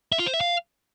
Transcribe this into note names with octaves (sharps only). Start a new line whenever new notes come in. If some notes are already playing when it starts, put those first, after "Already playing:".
E5
F4
C5
E5
F5